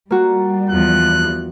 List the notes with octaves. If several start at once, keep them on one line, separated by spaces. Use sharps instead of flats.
G3 A#3 F#4
E2 F3 F#6